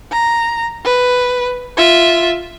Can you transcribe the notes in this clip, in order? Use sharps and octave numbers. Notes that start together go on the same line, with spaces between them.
A#5
B4
F4 E5